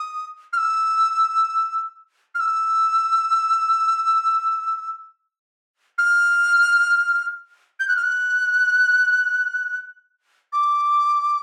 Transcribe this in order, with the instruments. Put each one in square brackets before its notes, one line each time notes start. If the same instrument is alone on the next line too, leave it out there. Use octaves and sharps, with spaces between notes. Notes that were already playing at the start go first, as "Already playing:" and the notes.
Already playing: [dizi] D#6
F6
E6
F6
E6
F6
G6
F#6
F6
F#6
D6